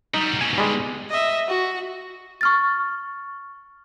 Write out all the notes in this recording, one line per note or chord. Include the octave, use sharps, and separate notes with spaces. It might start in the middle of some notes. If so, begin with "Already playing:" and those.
F#3 G3 D#4
G#2 B2 G#5
G3 G#3
D#5 E5
F#4
C#6 F6 A6